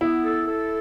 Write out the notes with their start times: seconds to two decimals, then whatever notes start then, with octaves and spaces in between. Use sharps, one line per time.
0.01 B3 E4
0.24 A4
0.47 A4